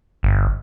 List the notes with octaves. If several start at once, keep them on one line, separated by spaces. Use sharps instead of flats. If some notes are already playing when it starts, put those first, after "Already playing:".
G1